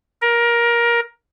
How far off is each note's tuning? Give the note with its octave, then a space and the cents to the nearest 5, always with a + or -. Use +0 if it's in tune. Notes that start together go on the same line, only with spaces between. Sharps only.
A#4 +20